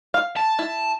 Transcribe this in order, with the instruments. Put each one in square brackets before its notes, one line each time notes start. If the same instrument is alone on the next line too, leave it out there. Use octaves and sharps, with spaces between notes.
[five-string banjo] F5
[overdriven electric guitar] A5
[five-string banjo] E4